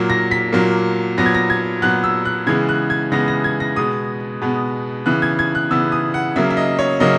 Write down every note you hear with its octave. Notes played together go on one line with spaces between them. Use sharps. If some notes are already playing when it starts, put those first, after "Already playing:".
Already playing: A#2 F#3 A#3
A#6
B6
A#2 F#3 A#3
A#2 F#3 B3 A#6
G#6
A#6
G#6
A#2 F#3 B3 F#6
E6
F#6
C#3 E3 G#3 B3 G#6
F#6
G#6
C#3 E3 G#3 B3 A#6
A#6
G#6
A#6
B2 G#3 B3 D#6
B2 G#3 B3
C#3 E3 B3 F#6
G#6
G#6
F#6
C#3 E3 B3 E6
D#6
F#5
C#3 F#3 A#3 E5
E5
D#5
C#5
C#3 F#3 A#3 D#5